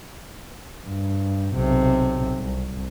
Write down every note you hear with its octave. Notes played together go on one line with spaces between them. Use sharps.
G2
B1 C3
C2